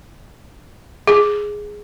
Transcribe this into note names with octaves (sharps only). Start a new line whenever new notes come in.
G#4